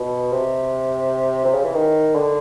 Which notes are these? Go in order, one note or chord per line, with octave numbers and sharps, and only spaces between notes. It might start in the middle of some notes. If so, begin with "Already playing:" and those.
Already playing: B2
C3
C3
C#3
E3
D#3
D3